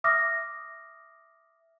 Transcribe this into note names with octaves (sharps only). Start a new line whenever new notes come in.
E5 D6 D#6 F6 A#6